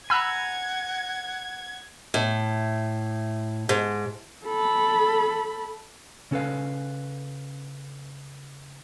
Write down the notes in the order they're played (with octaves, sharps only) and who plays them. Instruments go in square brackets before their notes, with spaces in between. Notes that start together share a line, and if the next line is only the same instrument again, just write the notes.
[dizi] F#5 [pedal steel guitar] G#5 A#5 [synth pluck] B5 E6 F#6 [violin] G#6
[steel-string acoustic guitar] A2
G#2
[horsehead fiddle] A4 B5
[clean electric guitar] C#3 C#4 A4 B4 F5